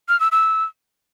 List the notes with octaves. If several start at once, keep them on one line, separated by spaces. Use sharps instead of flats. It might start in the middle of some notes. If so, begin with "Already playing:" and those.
F6
E6
E6